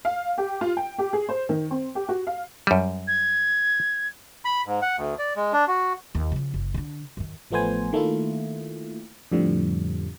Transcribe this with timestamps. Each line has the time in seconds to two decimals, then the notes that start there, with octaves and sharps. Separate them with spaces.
0.05 F5
0.38 G4
0.61 F4
0.77 G5
0.98 G4
1.13 G#4
1.29 C5
1.49 D#3
1.71 C4
1.95 G4
2.09 F#4
2.27 F5
2.67 F#2 G3
3.08 G#6
4.45 B5
4.66 G#2
4.82 F#5
4.97 D2
5.19 D5
5.36 G#3
5.53 D4
5.68 F#4
6.15 D#2
6.32 C#3 F3
6.54 F#1
6.74 D3 D4
7.17 F#2 D#3
7.51 A1 F3 A3 B3 C5 G#5
7.93 D#3 A3 A#3 E4 F4
9.32 F2 A2 D3 F3 G3